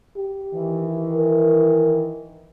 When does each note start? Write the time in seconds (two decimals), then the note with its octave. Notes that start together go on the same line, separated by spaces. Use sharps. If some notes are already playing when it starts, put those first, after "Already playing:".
0.17 G4
0.54 D#3 E3
1.14 A#4